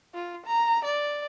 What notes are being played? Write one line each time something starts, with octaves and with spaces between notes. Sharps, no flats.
F4
A#5
D5